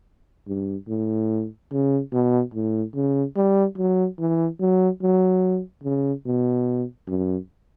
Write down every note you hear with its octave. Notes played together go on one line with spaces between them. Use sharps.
G2
A2
C#3
B2
A2
C#3
G3
F#3
E3
F#3
F#3
C#3
B2
F#2